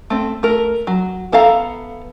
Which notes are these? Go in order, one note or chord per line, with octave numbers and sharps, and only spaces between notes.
A3 C4
A3 A#4
F#3
B3 A4 E5 F5 A#5